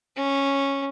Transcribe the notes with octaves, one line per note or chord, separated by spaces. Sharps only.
C#4